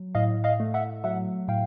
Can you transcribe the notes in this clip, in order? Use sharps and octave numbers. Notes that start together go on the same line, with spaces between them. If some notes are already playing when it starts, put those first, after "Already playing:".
Already playing: F#3
A2 D#5 F5
D#5 F5
A3
E5 F#5
F#3 E5 F#5
A2 F5 G5